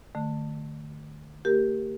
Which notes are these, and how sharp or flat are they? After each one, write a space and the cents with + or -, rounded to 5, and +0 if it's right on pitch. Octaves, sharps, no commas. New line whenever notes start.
D3 +45 A3 +15
A#3 -40 G4 +0 A#4 +0